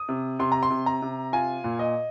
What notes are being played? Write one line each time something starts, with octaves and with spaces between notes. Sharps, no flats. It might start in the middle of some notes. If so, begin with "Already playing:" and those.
Already playing: D#6
C3
C3 C6
A#5
C6
C3
A#5
C3
F4 G#5
A#2
D#5